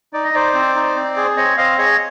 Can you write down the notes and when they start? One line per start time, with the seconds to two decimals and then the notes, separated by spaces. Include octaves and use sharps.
0.13 D#4 D5
0.24 D#5
0.34 D#4 C5 D5
0.54 C4
0.75 D#4
0.96 C4
1.17 G#4
1.37 C4 C#5 D#5
1.58 C4 D#5 F5
1.78 G#4 C#5 D#5